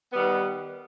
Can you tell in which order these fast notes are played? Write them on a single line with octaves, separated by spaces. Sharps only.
B3 G3 D#3